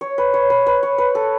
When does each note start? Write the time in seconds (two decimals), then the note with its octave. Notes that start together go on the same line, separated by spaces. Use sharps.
0.01 C#5
0.18 B4
0.34 C#5
0.50 B4
0.66 B4
0.83 C#5
0.98 B4
1.15 A4